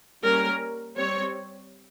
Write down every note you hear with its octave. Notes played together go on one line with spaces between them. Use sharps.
G3 A#3 C#4 A#4
G3 C4 C#5